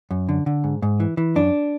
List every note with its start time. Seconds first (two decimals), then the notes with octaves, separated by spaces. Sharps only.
0.11 F#2
0.29 D3
0.46 D3
0.64 G#2
0.82 G#2
1.00 E3
1.17 E3
1.35 F#2 D4